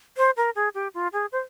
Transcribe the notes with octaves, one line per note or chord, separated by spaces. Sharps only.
C5
A#4
G#4
G4
F4
G#4
C5